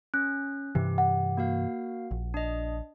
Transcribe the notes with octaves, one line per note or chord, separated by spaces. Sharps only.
C#4 F#6
G2 C3 E3 G4
F#5
A#3 F#4 F5
A#1
D4 D#5